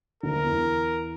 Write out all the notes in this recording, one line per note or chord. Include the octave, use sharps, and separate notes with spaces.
D2 D3 A#4
E2 E3